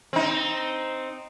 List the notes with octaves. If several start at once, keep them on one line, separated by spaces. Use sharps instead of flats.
C4 D#4